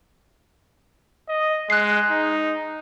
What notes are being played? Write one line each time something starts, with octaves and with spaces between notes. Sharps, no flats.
D#5
G#3 F#6 C7
D#4